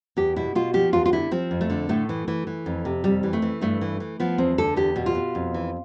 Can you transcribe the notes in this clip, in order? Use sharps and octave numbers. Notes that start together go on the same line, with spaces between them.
E2 G4
B2 E4
B2 F4
F3 G4
E2 F4
F4
D3 E4
F3 C4
F2
A3
D3
A2 A3
E3
E3
E3
F2
C3
F2 G3
E3
A3
E3
G2 A3
E3
E3
F3 B3
E2 C4
D3 A4
E2 G4
B2
F4
B2
F2
E3